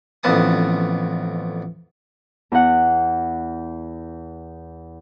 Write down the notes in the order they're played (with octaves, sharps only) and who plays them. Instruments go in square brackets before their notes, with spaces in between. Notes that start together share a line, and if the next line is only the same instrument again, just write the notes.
[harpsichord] A1 F2 B3 A5 D#6
[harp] E2 F#5